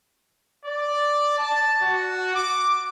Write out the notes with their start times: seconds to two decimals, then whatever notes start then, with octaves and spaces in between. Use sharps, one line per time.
0.65 D5
1.38 A5
1.82 F#4
2.35 D6